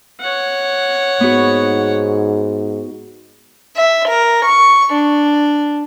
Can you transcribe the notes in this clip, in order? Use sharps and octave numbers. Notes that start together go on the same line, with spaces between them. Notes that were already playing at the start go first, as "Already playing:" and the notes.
C#5 F#5
G#2 B3 F#4
E5
A#4
C#6
D4